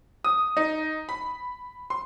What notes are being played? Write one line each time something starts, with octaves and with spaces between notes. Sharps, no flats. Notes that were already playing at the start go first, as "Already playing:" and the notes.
D#6
D#4
B5
C6